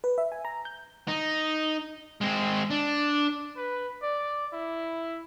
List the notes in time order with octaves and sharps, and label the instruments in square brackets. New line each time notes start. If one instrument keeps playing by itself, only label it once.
[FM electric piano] B4
E5
G#5
A#5
G6
[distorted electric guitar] D#4
G#3 C4
D4
[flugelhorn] B4
D5
E4